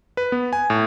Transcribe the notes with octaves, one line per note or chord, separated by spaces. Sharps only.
B4
B3
G#5
A2